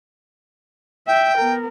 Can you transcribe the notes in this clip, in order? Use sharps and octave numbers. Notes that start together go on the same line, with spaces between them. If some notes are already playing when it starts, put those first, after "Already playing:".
E5 G5
B3 A#4